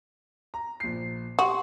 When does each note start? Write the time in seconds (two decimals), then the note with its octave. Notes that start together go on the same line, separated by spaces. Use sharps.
0.54 A#5
0.80 A#1 C7
1.39 F#4 G4 C6 C#6